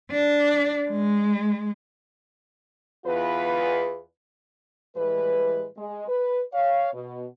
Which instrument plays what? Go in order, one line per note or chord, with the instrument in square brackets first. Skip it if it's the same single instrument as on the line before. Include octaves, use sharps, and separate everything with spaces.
[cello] D4
G#3
[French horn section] E2 F4 B4
[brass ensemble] A2 E3 G3 G#3 B4
G#3
B4
C#5 F5
B2